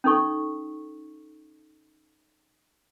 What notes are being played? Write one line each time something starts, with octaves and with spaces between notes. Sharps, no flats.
C#4 D#4 A4 C#6